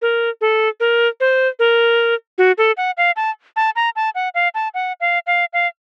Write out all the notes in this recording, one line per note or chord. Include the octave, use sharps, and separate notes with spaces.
A#4
A4
A#4
C5
A#4
F#4
A4
F#5
F5
A5
A5
A#5
A5
F#5
F5
A5
F#5
F5
F5
F5